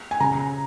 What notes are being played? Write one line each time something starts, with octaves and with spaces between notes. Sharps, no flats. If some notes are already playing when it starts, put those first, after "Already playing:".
G#5
C#3 A#5